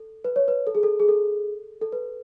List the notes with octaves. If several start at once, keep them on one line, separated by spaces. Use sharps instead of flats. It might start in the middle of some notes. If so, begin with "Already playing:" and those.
Already playing: A4
B4
C#5
B4
A4
G#4
A4
G#4
A4
A4
B4